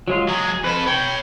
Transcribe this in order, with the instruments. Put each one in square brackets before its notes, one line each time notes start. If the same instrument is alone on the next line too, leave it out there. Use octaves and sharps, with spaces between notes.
[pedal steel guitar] F#3 G#3 F4
[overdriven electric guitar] F#3 G#3 [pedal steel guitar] G#4
[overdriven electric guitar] F2 A4 [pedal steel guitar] B4
[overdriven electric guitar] C#5 B5 [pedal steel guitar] G5